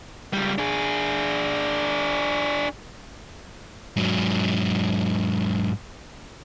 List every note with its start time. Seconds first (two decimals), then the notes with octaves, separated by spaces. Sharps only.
0.33 C#2 G3
0.58 D4 G#4
3.97 G#2 F#3